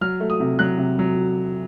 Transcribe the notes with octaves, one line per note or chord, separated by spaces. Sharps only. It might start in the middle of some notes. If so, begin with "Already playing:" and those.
F#3 F6
A3
D#6
C3
F#3 F#6
C3
F#3